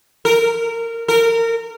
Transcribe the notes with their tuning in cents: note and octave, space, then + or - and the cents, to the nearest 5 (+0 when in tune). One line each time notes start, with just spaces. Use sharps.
A#4 -20
A#4 -25